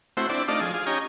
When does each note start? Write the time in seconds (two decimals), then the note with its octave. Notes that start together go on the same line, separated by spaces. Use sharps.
0.17 A3 C4 E4 F#4 C5
0.29 C4 D4 E4 D5
0.48 A3 D4 D#4 F4 D5
0.61 F3 G#4
0.74 F4 G#4
0.86 C#4 D#4 G4 G#5 A#5